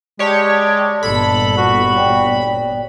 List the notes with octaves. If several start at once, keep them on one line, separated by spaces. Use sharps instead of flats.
G#3 G4 C#5 D5 A5
G1 A#2 B3 A4 B5
F#4
C#5 D5 G5